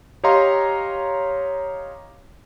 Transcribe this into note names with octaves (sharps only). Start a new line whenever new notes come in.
G4 C#5 D#5 F5 A#5 C6